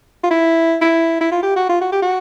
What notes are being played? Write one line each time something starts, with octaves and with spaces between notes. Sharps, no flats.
F4
E4
E4
E4
F4
G4
F#4
F4
F#4
G4
F#4